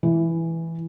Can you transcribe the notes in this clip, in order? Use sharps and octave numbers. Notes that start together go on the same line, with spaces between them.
E3